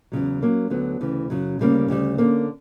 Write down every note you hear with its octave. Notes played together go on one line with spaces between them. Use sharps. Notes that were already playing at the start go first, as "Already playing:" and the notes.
E2 C#3 F#3
F#3 A#3 C#4
D2 D3 F#3 B3
D2 C#3 E3
F#2 C#3 F#3
D2 C#3 G3 A#3 C#4
D2 C#3 G3
D3 A#3 C#4